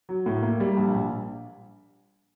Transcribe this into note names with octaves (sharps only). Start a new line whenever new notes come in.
F#3
A2
A#3
G3
A#1
A#1